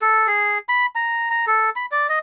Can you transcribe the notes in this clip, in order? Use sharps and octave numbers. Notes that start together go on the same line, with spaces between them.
A4
G#4
B5
A#5
A#5
A4
B5
D5
D#5